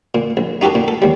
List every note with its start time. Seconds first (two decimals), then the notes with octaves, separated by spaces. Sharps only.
0.15 A#2
0.37 A#1
0.61 D#4 F#4 G4 A4 A#4
0.75 A#2
0.88 A4
1.02 D#2 G3